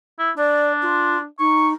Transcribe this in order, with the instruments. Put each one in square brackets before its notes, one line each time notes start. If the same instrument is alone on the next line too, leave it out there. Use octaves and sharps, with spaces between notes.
[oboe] E4
[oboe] D4 [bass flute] D5
[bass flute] F4
[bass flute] D#4 [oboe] C#6